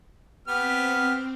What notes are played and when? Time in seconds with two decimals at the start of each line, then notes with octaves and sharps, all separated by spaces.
0.48 B3 C4 G4 F6